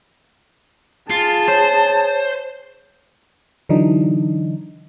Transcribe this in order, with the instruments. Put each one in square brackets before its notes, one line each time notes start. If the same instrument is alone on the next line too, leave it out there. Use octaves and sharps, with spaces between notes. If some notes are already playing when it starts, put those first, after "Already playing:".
[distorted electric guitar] F4 [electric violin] G#4 A5
[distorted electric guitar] C5 [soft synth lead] C#5
[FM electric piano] D3 E3 F#3 D4 D#4